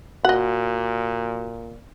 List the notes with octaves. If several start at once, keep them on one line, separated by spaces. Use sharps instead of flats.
A#2 F#4 D#5 F#5